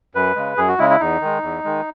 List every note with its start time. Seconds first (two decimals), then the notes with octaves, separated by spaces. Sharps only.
0.15 F#2 B4
0.36 C#3 G#3
0.57 F#2 G#4
0.68 F#4
0.79 C#3 G#3 E4
0.90 E4
1.00 E2 D#4
1.21 D#3 G#3
1.42 E2
1.64 D#3 G#3